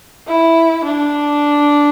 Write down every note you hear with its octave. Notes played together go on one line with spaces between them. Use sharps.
E4
D4